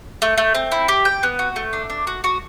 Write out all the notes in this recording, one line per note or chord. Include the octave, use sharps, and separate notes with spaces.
A3
A3
C4
E4
G4
G5
B3
F#4
A3
D4
D4
F#4
F#4